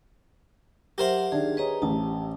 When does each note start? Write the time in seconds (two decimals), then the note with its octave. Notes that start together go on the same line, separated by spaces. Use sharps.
0.98 F#3 G4 A#4 C5 E5 F#5
1.32 D#3 D4 G#4
1.57 G#4 B4 C#5 D#5 A#5
1.82 A1 A5